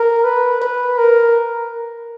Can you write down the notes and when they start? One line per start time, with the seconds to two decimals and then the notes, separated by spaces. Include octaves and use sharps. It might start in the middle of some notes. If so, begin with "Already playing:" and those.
Already playing: A#4
0.24 B4
0.62 B4
0.98 A#4